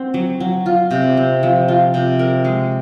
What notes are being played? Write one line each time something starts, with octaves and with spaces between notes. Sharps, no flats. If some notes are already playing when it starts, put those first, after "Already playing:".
Already playing: C4 F#4
F#3
F#3
F4
C3
C4
F3
F4
C3
A#4
G#3